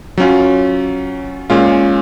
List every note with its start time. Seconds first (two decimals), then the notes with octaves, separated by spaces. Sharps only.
0.18 F#3 C#4 F4
1.50 A#2 G#3 C#4 F4